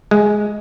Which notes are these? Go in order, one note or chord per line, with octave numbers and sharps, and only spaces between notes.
G#3